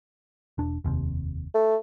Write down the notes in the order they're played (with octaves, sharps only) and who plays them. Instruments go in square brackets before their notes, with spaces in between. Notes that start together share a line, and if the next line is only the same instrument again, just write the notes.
[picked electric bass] E1 D4
F1 D#2 C3
[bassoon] A3